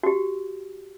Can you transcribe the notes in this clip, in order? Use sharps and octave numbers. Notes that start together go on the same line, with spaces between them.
F#4 G4